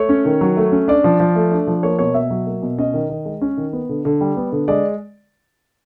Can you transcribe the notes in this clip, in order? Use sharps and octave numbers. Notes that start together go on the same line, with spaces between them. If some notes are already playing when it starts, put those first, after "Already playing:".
Already playing: A3 C#5
C#4
D#3
F#3
A3
C#4
D4 D5
F3
F3
A3
D4
F3
A#3 C#5
B2 C#5
B2 E5
F#3
A#3
B2
C#4 D#5
D#3
D#3
G#3
C#4
D#3
B3
D3
D3
G3
B3
D3
G#3 D5